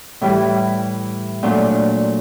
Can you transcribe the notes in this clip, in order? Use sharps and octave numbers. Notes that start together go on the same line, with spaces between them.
A2 E3 G3
A#2 F#3 A3 D4